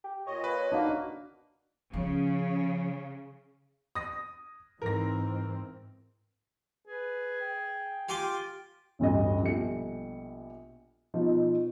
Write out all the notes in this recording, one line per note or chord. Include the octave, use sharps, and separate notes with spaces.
G4
A#2 C#5 D#5
B4
A#3 D4 D#4 F#4
C#3 F3
D#6 A#6
G#2 E3 C4 A#4 A#6
G#4 B4
G5
F4 G4 G#5 C6 D6
A1 D2 G2 D#5
A#1 B2 G3 A3 G4 C#7
B2 F3 D#4